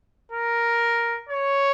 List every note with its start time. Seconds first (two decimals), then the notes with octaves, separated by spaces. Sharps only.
0.32 A#4
1.29 C#5